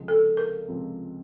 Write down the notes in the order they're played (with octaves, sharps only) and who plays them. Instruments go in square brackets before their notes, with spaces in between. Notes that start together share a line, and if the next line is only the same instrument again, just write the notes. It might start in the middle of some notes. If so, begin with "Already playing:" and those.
Already playing: [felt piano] C#2 C3 F3 G#3 C4
[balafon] A4
A#4
[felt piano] C#2 C3 F3 G#3 C4